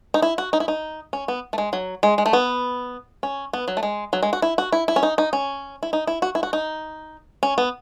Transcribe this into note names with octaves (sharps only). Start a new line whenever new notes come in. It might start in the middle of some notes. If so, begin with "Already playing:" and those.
D#4
E4
F#4
D#4
E4
D#4
C#4
B3
A3
G#3
F#3
G#3
G#3
A3
B3
C#4
B3
F#3
A3
G#3
F#3
G#3
F#4
E4
F#4
E4
E4
C#4
D#4
D#4
C#4
E4
D#4
E4
F#4
E4
F#4
D#4
C#4
B3